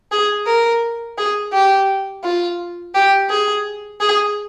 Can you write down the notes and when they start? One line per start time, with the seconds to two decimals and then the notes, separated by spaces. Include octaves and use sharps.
0.12 G#4
0.47 A#4
1.18 G#4
1.53 G4
2.24 F4
2.95 G4
3.30 G#4
4.01 G#4